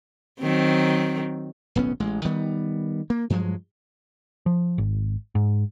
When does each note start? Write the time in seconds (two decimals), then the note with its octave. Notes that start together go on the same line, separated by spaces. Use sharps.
0.40 D#3 F#3 C4
1.75 D1 B1 B3 C#4
2.00 A1 G#3
2.25 D#3 G3 B3
3.10 A#3
3.30 G2 F3 F#3 G#3
4.46 F3
4.78 G#1
5.35 G#2